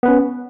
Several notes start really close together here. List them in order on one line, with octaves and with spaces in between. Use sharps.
B3 B4 C#4